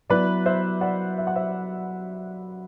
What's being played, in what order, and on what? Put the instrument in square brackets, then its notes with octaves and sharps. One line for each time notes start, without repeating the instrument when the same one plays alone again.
[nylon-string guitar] F#3 B3 E4 [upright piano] B4 D5
[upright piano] C5 E5
D5 F#5
E5
F#5
C5 E5